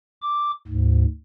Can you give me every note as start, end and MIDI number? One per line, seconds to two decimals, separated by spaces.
0.22 0.51 86
0.67 1.05 38
0.67 1.05 44